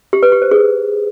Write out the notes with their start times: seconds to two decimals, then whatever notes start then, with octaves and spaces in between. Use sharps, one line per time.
0.13 G4
0.23 B4
0.32 G4
0.42 C5
0.51 G#4